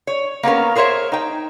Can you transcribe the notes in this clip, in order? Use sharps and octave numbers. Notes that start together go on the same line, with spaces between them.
C#5
A#3 B3 C#4 A#4
G#4 A#4 C5 C#5 E5
D#4 G5